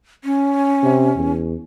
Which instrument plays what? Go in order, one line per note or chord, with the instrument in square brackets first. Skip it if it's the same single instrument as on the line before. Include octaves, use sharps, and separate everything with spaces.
[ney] C#4
[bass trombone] C3
E2